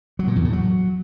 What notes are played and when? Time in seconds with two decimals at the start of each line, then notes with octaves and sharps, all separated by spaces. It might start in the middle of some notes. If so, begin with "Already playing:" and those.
0.19 F#3
0.28 A#2
0.36 E2
0.45 A2
0.53 F#3